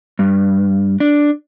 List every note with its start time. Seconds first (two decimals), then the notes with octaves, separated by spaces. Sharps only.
0.19 G2
1.00 D4